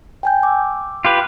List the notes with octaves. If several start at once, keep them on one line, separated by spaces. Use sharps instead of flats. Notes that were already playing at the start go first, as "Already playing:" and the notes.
G5 G#5 G6
D6 E6
F4 G4 B4